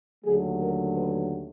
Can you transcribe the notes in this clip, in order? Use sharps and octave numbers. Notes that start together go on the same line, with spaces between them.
D#2 D3 F#3 A3 G#4
A#4
B4